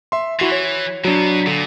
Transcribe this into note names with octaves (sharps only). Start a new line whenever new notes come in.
E5 C6
E3 E4 F#4 C7
C#5
B2 F#3 B3 D4
A#2 D3